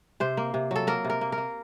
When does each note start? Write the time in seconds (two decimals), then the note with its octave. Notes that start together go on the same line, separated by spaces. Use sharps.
0.20 C3 C5
0.37 A#3
0.54 C3
0.71 F#3 A4
0.87 A#3 A#4
1.05 C3
1.10 A#4
1.21 A#3
1.32 A#4
1.38 A#3